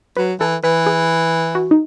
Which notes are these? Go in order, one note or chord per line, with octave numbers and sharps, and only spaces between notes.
F#3 B4
E3 A4
E3 B4
G#4
F#4
D#4